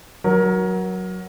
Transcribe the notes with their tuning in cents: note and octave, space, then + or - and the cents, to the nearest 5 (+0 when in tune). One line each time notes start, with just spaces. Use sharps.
F#3 +0 A#4 +20